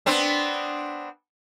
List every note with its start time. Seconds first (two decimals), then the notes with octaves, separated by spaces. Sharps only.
0.06 B3 C4 D4